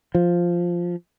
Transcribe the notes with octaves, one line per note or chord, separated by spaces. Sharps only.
F3